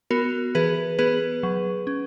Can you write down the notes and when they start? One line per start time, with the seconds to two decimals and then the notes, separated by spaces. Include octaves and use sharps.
0.10 B3 F#4 A#4
0.55 E3 G#4 B4
0.99 B3 G#4 B4
1.43 F#3
1.87 C#4